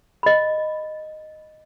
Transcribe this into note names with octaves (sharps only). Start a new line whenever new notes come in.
D#5 B5